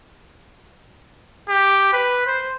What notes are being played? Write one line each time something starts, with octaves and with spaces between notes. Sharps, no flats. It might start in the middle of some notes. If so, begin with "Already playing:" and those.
G4
B4
C5